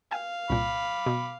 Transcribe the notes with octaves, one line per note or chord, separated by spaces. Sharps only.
F5 G5 G#5
C2 A#2 B5 D6
B2